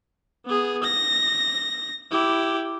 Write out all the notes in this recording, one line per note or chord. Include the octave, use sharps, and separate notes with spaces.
B3 G#4
A#6
E4 G4